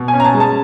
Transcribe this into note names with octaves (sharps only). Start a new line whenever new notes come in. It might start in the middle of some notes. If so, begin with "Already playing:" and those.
Already playing: B2
G#5
C#4
A#5
A5
G#3
A5